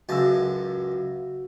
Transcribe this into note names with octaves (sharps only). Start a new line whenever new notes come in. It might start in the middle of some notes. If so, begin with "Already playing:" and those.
C#2 F#2 F#4 A5 E6